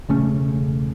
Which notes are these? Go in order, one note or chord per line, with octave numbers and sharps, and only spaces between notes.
E1 C#3 A3 C#4